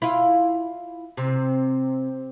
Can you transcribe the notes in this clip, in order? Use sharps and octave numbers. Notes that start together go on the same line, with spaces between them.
E4 F4
C3